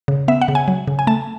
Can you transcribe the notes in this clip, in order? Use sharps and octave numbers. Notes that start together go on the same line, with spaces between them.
C#3
B3 E5
F#5
C#3
G#5
F#3
C#3
G#5
A3 A5